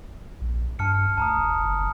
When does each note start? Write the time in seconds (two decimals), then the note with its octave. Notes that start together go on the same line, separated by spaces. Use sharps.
0.41 A#1
0.79 G2 A5 F6 C#7
1.18 D2 A5 A#5 D#6
1.38 F1
1.60 F#1